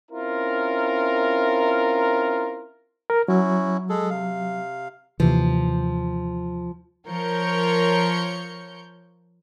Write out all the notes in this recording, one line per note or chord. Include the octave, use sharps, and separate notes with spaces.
C4 C#4 E4 F4 A#4
A#4
F#3 C#4 E4 F#4
G#3 G#4 A4
C3 F5
D#2 C3 E3 F3
F3 A#4 C#5 G6 C#7